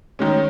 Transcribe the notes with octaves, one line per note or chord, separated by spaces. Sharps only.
D#3 G#3 C#4